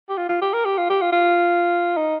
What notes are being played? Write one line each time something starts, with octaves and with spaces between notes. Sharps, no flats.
G4
F4
F4
G4
A#4
G4
F4
G4
F4
F4
D#4